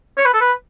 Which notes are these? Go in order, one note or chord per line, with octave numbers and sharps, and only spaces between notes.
C#5
B4
A4
B4